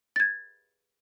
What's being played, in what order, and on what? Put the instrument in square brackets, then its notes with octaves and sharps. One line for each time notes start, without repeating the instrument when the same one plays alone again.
[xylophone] G#6 A6